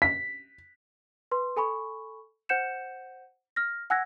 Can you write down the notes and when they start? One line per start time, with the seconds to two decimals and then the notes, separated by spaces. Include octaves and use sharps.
0.02 B6
1.31 B4 C6
1.57 A4 G#5 B5 C#6
2.49 C5 F#5 G6 C#7 E7
3.56 F6 A#6
3.90 F#5 G#5 E6 F#6 G#6 A#6